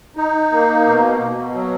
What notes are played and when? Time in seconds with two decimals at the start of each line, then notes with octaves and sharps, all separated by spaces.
0.17 D#4
0.52 A#3
0.85 B2
1.20 B2
1.54 F#3